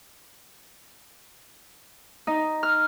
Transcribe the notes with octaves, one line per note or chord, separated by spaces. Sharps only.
D#4
F6